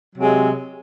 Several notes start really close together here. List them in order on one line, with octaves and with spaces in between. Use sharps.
F#3 C3 G#3